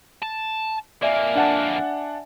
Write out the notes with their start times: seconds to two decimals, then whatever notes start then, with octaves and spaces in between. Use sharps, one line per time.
0.22 A5
1.02 F2 A#3 D5 E5 G#5
1.35 D4 F#5 A5